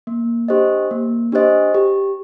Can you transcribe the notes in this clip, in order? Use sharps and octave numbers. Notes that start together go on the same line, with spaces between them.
A#3
D4 G4 C5 D#5
A#3
D4 G4 C5 D#5
G4